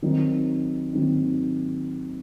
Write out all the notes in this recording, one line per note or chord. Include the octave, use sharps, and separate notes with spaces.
D#3 F#3 C4 D#4
D#3 F#3 C4 D#4